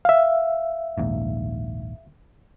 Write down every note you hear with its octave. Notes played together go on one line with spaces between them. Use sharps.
E5 F5
A#1 D#2 G#2